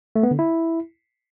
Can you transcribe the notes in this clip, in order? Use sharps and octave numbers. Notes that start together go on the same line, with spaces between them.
A3
B3
D3
E4